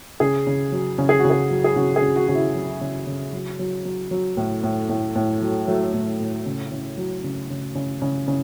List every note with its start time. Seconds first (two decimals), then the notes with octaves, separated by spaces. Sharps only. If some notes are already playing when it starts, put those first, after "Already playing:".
0.20 C#3 G#4
0.47 C#3
0.72 F#3
0.98 C#3
1.09 G#4
1.19 F#4
1.25 C#3
1.30 G#4
1.51 F#3
1.64 G#4
1.76 C#3 F#4
1.96 G#4
2.02 C#3
2.16 F#4
2.27 C#3 F#4
2.35 E4
2.55 F#3
2.81 C#3
3.07 C#3
3.33 F#3
3.59 F#3
3.85 F#3
4.11 F#3
4.37 A2
4.63 A2
4.89 A2
5.16 A2
5.41 F#3
5.67 F#3 A3
5.93 A2
6.20 A2
6.46 C#3
6.72 C#3
6.98 F#3
7.24 C#3
7.50 C#3
7.75 C#3
8.02 C#3
8.28 C#3